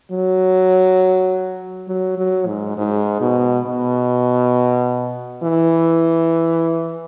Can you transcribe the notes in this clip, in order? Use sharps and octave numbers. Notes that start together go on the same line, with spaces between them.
F#3
F#3
F#3
G#2
G#2
B2
B2
E3